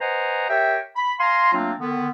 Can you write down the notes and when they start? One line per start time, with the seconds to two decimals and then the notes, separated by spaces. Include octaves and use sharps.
0.01 B4 C5 D#5 F#5 G#5 A#5
0.50 G4 A#4 C#5 E5 G5
0.96 B5
1.20 F5 G#5 A#5 C6
1.53 F#3 A3 A#3 C4 D4 F4
1.80 D3 D#3 B3